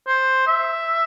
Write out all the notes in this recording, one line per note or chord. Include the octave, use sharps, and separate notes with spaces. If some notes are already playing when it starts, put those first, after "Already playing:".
C5
E5